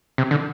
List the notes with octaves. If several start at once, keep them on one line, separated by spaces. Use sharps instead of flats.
C3
D3